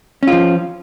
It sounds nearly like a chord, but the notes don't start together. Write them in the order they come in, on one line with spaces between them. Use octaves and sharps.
C#4 F4 F3